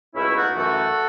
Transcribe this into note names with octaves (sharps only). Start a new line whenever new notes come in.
C#2 B2 A3 C#4 E4
D#4 F#4
F#2 E3 A3 F#4 A4